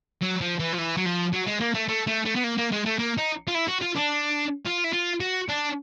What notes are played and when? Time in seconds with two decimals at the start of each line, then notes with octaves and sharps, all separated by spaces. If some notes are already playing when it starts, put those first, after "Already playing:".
0.22 F#3
0.41 F3
0.60 E3
0.73 F3
0.78 E3
0.97 F#3
1.05 F3
1.33 F#3
1.47 G#3
1.60 A#3
1.74 A3
1.88 A3
2.07 A3
2.25 A3
2.35 B3
2.44 A#3
2.57 A#3
2.71 G#3
2.85 A3
2.99 A#3
3.18 D#4
3.48 F4
3.55 E4
3.68 F#4
3.82 F4
3.96 D4
4.65 F4
4.84 E4
4.93 F4
5.20 F#4
5.49 D4